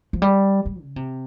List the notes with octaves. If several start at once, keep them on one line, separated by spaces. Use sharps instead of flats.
F3
G3
G3
C#3
C3